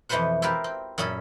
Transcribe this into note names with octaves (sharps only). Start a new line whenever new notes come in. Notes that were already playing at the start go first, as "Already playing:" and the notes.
F2 B2 E3 B4 C5 F#5
E4 F4 G4 A#4 B4
C4
F#2 A#2 C#4 G#4 A4 B5